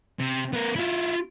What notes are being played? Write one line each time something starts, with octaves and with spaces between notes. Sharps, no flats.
C3
B3 A#4
E4 F4